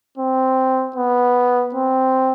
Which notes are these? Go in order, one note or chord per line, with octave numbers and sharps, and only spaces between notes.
C4
B3
C4